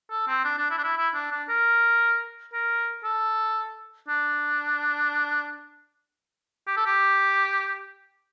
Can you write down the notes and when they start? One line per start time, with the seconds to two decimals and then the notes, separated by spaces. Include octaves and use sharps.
0.11 A4
0.28 C4
0.45 D4
0.58 D4
0.71 E4
0.78 D4
0.84 E4
0.97 E4
1.14 D4
1.31 D4
1.49 A#4
2.53 A#4
3.04 A4
4.08 D4
6.67 G4
6.77 A4
6.86 G4